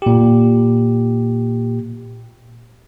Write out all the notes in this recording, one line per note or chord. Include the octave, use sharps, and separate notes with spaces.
A#2 G4